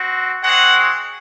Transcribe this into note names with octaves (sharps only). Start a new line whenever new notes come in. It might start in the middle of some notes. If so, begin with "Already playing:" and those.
Already playing: C4 F#4
G#3 C4 F#4 F#5